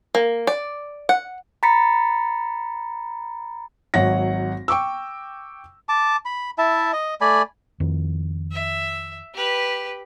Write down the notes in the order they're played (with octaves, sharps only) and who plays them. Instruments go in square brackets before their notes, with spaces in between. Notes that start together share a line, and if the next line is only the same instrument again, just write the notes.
[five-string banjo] A#3
D5
F#5
[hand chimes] A#5 B5 A6 B6 C#7
[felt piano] G#1 F#3 C#5 F#5 A#6
G5 C#6 D6 E6
[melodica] A5 D6
B5
E4 E5 A5
D#5
A3 D5 G#5 B5
[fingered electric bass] F2 D#3
[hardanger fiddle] E5
G4 B4